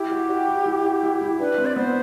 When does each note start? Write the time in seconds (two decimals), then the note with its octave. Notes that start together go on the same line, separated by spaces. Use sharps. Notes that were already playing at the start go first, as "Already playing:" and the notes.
Already playing: E4 G4
0.11 F#4
0.29 F#4
0.48 E4
0.66 E4
0.84 F#4
1.03 E4
1.21 E4
1.40 D4 B4
1.58 C4
1.66 D5
1.76 B3 C5